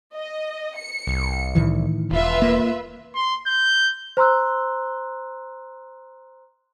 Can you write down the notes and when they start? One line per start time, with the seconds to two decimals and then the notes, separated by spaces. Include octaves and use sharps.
0.13 D#5
0.76 C#7
1.07 C2
1.55 A2 D#3 E3
2.11 E1 F4 B4 E5
2.42 A#3
3.15 C6
3.47 G6
4.17 C5 A#5 C6 E6 F#6